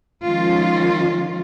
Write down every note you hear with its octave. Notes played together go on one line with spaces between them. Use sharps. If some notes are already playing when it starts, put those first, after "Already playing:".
D#3 F3 G#3 C#4 F4